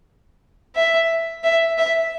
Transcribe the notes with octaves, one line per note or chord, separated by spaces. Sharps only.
E5
E5
E5